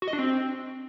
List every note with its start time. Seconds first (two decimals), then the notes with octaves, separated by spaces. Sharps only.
0.02 F#4
0.08 D#5
0.13 D4
0.19 C4